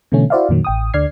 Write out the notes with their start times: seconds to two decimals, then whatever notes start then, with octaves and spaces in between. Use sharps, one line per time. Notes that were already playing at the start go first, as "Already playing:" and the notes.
0.12 B2 D3 E3 A3 C#4
0.30 E4 F#4 C5 D5 E5 F5
0.49 F2 A#2 D#3 F#3
0.65 A1 G5 D#6
0.94 D2 D3 D5 F6 G#6 C7